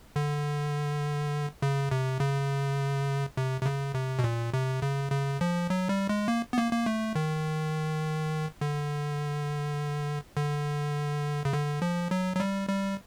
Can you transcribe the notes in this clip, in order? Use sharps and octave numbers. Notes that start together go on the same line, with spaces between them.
D3
C#3
C3
C#3
C3
C3
C#3
C3
B2
A#2
C3
C#3
C#3
F3
F#3
G3
G#3
A#3
B3
A#3
A#3
A3
D#3
D3
D3
C#3
D3
F3
F#3
F#3
G3
G3